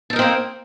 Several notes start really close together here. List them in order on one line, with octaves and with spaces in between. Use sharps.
A4 D#4 A#4 C4 A#3